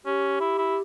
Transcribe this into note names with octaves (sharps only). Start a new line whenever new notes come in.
C#4 G4
E4
E4